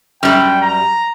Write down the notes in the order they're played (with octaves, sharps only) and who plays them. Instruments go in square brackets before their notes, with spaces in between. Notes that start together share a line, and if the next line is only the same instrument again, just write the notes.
[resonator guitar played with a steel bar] F#2 G3 [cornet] G5
[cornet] A#5